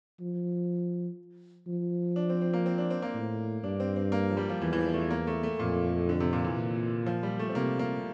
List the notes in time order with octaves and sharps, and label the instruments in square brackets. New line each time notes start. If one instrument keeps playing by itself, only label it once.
[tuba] F3
F3
[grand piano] D4
C4
C4
A#3
C4
D4
C4
A#3
[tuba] A2
[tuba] G2 [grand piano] D4
[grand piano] C4
C4
A#3
F3
G3
F3
[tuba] E2 [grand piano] E3
[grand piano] E3
F3
A3
A#3
A3
A3
[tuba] F2 [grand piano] A#2
[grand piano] D3
C3
A#2
E3
[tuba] A#2
[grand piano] F3
G3
A3
C4
[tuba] C3 [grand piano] A#3
[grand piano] A#3